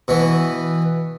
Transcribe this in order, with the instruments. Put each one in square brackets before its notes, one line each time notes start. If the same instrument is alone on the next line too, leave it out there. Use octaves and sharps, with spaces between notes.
[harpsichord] B2 E3